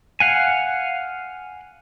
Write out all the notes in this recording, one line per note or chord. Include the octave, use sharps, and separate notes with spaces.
F5 F#5 G#5